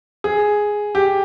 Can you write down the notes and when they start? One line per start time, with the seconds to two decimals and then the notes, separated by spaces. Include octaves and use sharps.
0.24 G#4
0.95 G4